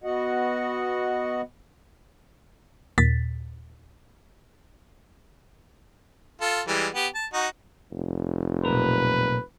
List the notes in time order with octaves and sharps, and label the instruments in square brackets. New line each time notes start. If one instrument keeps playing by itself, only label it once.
[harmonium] B3 F#4 D#5 F#5
[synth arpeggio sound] D#2 A#2 A6 B6
[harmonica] F4 A4
E3 G3 G#3
B3 G4
A5
D#4 F#4
[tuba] F1
[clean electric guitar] B1 A#2 A#4 [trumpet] B4